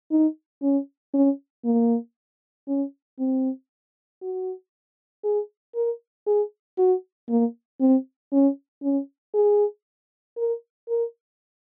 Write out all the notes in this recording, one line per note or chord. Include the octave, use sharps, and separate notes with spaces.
D#4
C#4
C#4
A#3
C#4
C4
F#4
G#4
A#4
G#4
F#4
A#3
C4
C#4
C#4
G#4
A#4
A#4